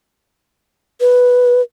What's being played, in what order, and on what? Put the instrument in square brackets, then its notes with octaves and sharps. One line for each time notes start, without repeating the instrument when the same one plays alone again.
[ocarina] B4